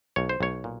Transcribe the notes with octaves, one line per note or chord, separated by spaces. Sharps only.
B1 C#5
C5
B1 C#5
A#2